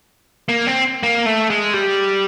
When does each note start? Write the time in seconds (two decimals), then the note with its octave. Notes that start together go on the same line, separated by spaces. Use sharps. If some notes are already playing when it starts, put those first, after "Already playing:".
0.49 A#3
0.67 C4
1.03 A#3
1.26 A3
1.50 G#3
1.74 G3